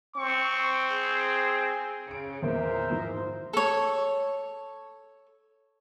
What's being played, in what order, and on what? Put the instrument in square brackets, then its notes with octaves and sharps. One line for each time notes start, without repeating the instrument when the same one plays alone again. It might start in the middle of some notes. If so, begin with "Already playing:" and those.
[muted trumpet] C4 [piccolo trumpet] C#6
[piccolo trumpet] G#4
[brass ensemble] C#3 [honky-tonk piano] C#7 D7
[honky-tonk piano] E2 A#2 G#3 [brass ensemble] A#4 C5 E5
[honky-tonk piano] G#2 E3 F3
[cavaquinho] A4 C#5